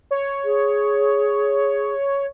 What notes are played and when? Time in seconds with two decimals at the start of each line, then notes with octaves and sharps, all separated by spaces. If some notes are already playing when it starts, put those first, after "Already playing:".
0.11 C#5
0.45 G#4